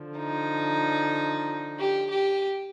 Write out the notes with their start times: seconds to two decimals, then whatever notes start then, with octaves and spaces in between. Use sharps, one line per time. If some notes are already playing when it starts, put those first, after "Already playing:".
Already playing: D3 F3
0.18 D#4
1.79 G4
2.11 G4